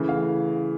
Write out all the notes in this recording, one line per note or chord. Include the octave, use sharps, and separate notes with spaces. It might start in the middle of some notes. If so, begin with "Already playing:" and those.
Already playing: C#3 E3 A3
F5